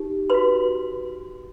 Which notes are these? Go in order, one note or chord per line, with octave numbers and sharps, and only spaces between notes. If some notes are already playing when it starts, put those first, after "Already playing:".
Already playing: D#4 G4
F#4 B4 C6